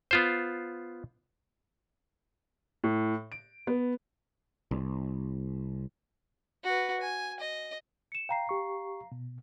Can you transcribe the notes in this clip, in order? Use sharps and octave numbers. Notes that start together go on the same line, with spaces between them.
B3 F4 C5
A2
D7
B3
C2
F#4 B4
G#5
D#5
C#7 E7
F5 G5 A#5 C7
G4 C#6
B2